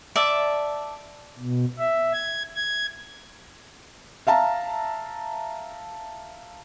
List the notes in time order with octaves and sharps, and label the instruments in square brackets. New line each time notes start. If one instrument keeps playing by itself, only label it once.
[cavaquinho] D5 E5 A5
[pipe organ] B2
E5
G#6
G#6
[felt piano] E5 F5 A5 A#5